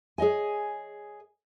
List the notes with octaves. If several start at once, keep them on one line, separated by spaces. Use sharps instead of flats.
G#4 C#5 D#5 G#5